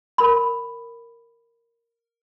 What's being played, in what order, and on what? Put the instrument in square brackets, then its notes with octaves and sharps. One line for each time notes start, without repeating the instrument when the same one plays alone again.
[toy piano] A#4 B5